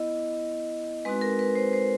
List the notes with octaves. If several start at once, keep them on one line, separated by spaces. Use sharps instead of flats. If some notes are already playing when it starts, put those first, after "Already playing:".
Already playing: B3 E4 D#5
G#3 C4 D#4 F#4 B4
A#4
B4
C5
C5